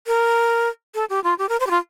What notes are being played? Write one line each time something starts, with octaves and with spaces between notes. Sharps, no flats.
A#4
A4
G4
F4
G4
A#4
C5
G4
F4